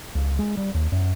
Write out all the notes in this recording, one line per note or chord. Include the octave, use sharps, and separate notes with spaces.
C#2
G#3
G3
D#2
F#2